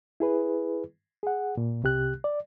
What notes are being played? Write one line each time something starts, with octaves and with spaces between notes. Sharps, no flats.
E4 G#4 B4
G#4 F#5
A#2
C2 C3 G4 F#6
D5